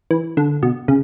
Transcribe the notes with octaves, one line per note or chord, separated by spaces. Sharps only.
E3
D3
B2
C#3